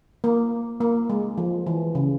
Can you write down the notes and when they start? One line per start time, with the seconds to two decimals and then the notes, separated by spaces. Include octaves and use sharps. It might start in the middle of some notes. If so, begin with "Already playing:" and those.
0.24 A#3
0.81 A#3
1.10 G#3
1.38 F3
1.67 E3
1.95 C#3